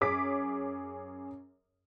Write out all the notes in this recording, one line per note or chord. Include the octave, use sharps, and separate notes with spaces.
F#2 C#4 G#4 D6 B6